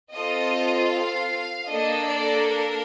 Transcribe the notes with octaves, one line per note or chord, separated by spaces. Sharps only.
C4 F4 A4 D#5
F5
A#3 D4 A4 D#5
D5
A#4